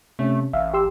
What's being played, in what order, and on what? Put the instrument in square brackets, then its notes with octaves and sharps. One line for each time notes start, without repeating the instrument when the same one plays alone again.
[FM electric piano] C3 C#4 [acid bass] A3
[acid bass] A1 [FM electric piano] E5 F5
[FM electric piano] G4 C6 E6